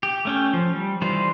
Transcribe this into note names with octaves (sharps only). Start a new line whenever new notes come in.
G4
A3 C#4 G5
F3
G3
D#3 E3 G3 F4 C5